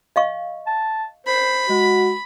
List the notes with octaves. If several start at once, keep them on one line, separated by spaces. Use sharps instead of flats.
D#5 F5 C#6
A5
C5 B5
G#3 F#4